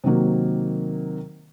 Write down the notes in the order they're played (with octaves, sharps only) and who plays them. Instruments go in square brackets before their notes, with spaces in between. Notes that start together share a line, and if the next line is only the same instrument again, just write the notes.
[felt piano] C3 D#3 F#3 A#3